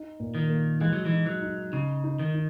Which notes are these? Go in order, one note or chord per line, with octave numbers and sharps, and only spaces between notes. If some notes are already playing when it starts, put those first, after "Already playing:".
Already playing: D#4
A#2
D#3
A#3
E3 G#3
F#3
E3
D#4
F#3
D#4
C#3 D#4
D#4
D#3
D#4